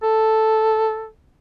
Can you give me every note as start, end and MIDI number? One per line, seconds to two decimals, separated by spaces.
0.03 1.08 69